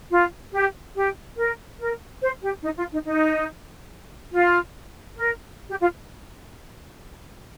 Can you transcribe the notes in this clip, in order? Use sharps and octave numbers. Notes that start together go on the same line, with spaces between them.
F4
G4
G4
A#4
A#4
C5
G4
D#4
F4
D#4
D#4
F4
A#4
G4
F4